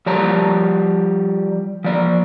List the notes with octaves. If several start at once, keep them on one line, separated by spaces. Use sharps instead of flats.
F3 G3 C#5 A5 A#5
F3 D5